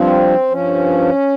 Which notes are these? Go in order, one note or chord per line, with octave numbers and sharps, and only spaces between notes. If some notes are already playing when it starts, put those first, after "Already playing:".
Already playing: G2 F3 C4
G2 F3 C#4